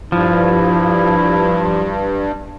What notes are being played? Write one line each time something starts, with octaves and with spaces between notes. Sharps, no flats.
G2 F3 E4